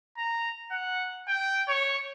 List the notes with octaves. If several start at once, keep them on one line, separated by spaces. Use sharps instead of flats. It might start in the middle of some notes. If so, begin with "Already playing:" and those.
A#5
F#5
G5
C#5